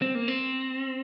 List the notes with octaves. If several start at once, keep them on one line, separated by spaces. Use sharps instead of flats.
C4
A#3
C4